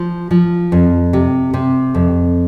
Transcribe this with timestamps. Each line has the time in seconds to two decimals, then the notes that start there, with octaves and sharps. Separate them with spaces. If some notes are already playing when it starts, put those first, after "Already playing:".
Already playing: F3
0.31 F3
0.72 F2
1.13 C3
1.54 C3
1.95 F2